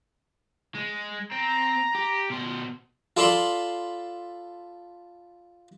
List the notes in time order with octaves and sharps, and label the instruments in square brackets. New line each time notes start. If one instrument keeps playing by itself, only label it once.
[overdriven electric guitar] G#3
[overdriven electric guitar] C4 [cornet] A#5
[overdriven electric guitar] G4
B2 C5
[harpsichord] F4 A4 D5 A5 B5 C6